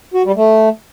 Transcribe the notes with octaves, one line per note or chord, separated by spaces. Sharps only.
F#4
G3
A3